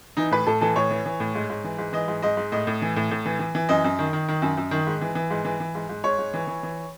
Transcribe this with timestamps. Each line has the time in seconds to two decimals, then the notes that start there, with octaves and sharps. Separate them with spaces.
0.17 E3 D#4
0.31 A2 B4
0.47 A2 A4
0.61 E3 A4
0.76 A2 C#5
0.91 E3
1.06 E3
1.20 A2
1.35 G#2
1.49 G#2
1.64 E3
1.78 G#2
1.93 E3 D#5
2.08 G#2
2.22 G#2 D#5
2.37 G#2
2.52 A2 D#5
2.67 A2
2.82 E3
2.96 A2
3.11 A2
3.25 E3
3.39 E3
3.55 E3
3.69 F#2 D#5
3.84 F#2
3.99 D#3
4.13 D#3
4.28 D#3
4.42 F#2
4.57 F#2
4.71 D#3
4.87 G#2
5.01 E3
5.15 E3
5.30 G#2
5.45 E3
5.60 E3
5.75 G#2
5.89 G#2
6.04 G#2 C#5
6.18 G#2
6.34 E3
6.47 E3
6.63 E3